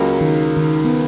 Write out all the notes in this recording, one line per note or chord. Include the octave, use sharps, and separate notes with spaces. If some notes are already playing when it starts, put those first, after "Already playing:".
Already playing: C#2 C#3 F#3 A#3
D#3
D#3
B3